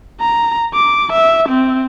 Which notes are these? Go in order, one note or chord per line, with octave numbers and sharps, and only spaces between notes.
A#5
D6
E5
C4